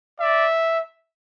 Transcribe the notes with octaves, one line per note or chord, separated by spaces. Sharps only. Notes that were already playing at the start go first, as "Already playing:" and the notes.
D5 E5